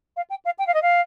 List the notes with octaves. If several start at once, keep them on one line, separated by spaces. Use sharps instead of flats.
F5
G5
F5
G5
F5
D#5
F5